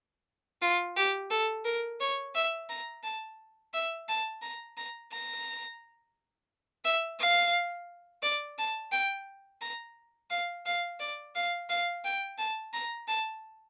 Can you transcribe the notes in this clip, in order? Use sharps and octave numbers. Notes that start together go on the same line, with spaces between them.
F4
G4
A4
A#4
C#5
E5
A#5
A5
E5
A5
A#5
A#5
A#5
E5
F5
D5
A5
G5
A#5
F5
F5
D5
F5
F5
G5
A5
A#5
A5